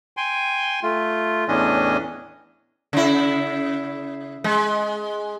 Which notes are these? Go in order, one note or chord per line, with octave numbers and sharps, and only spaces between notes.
G5 G#5 C6
A3 F4
E2 A2 E3 C#4 D4 D#5
C#3 E4
G#3